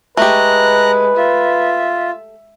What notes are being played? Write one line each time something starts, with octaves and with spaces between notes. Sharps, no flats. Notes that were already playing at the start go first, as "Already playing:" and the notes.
G#3 A3 G4 B4 A#5 F#6
F4 E5